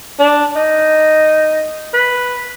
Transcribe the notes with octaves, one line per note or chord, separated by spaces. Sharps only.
D4
D#4
B4